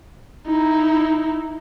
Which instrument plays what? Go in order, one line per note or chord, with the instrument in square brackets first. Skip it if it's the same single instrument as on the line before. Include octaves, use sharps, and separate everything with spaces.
[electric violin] D#4 E4